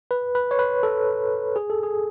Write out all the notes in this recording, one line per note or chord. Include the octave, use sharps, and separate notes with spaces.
B4
B4
C#5
B4
A4
G#4
A4
G#4